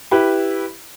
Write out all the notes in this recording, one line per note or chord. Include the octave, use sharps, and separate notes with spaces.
E4 G4 B4 E5